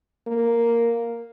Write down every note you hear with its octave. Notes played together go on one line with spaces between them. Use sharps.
A#3